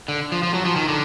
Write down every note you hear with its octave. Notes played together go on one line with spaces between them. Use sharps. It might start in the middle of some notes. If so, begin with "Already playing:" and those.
D3
F3
F3
F#3
F3
D#3
D3